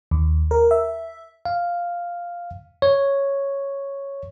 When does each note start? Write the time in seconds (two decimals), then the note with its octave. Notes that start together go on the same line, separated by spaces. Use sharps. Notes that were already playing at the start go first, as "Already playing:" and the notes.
0.11 D#2
0.51 A#4
0.71 E5
1.45 F5
2.82 C#5